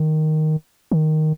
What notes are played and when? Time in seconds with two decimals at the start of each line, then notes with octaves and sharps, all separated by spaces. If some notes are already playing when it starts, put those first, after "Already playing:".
Already playing: D#3
0.92 D#3